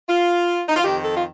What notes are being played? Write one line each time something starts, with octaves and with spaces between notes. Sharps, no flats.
F4
D#4
F4
F2 D#3 G4
A4
F4